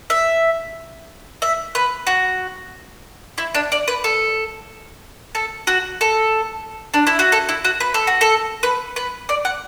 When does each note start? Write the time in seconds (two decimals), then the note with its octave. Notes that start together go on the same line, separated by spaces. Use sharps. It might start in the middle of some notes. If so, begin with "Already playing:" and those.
0.10 E5
1.42 E5
1.75 B4
2.07 F#4
3.38 E4
3.55 D4
3.72 D5
3.88 B4
4.04 A4
5.35 A4
5.67 F#4
6.01 A4
6.94 D4
7.07 E4
7.19 F#4
7.32 A4
7.49 E4
7.65 F#4
7.80 B4
7.94 A4
8.07 F#4
8.21 A4
8.63 B4
8.96 B4
9.29 D5
9.45 F#5